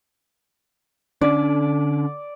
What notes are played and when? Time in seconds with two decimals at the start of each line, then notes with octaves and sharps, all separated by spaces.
1.21 D3 C#4 D4 D5